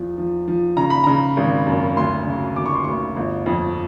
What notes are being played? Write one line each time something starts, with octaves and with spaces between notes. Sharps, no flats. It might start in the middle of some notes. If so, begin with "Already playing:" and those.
Already playing: E2 F3
F3
F3
C#3 A#5
B5
C#3 A#5
G#1
F#2
D2 C6
C#3
D2 D6
C#6
C6
D2 C#6
G1
F2